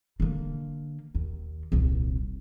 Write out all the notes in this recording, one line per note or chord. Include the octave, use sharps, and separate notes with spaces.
D3 A#3
D#2
D#1 C2